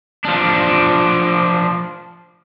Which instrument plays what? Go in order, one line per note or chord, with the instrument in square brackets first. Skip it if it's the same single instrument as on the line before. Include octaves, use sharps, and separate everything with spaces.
[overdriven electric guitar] F3 D4